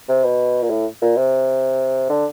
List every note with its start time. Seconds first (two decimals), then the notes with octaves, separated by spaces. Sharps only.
0.09 C3
0.24 B2
0.63 A#2
0.70 A2
1.02 A#2
1.17 C3
2.09 D3